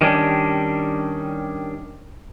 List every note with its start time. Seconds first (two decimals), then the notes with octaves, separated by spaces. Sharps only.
0.01 D#3 G3 C#4 D4